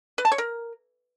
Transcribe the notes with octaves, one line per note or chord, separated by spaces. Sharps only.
B4
A5
C#5
A#4